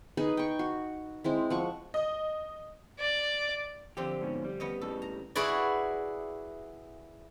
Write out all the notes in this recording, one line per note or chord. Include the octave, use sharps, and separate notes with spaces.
D#4 G#4 B4
G5 C#6
F#4
G#3 C4 E4
F3 F#5 C#6
D#5
D5
D3 F3 C4 G4
G#2 B2 C#4
G3
B3 C#4 D#5
A2 C#3 G3 A4
A#5
E4 F#4 G#4 B4 D5